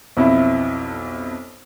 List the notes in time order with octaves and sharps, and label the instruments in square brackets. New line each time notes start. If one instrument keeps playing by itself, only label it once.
[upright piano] B1 F2 E4